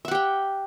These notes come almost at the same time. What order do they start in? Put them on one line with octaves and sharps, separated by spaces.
E5 F#5 G4 G5